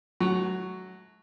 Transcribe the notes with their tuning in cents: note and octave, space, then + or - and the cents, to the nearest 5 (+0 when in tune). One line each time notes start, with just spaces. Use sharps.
F#3 +0 A3 -35 C#6 +0